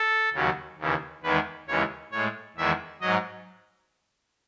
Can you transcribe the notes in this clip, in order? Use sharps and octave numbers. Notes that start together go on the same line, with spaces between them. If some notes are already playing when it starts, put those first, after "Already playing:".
Already playing: A4
D#2 C#3 F#3
D#2 C#3 E3
E2 D#3 G#3 B4
D#2 C#3 E3 G#3 C#5
A2 G#3 C#5
E2 D#3 G#3 E5
G#2 F#3 D#5